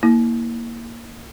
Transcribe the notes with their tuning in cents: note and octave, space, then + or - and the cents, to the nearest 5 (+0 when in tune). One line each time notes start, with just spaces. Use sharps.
A#3 +0 E4 -25